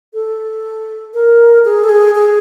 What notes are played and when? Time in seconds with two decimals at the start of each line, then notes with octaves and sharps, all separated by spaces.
0.14 A4
1.14 A#4
1.65 G#4
1.84 A4
1.89 G#4
2.15 G#4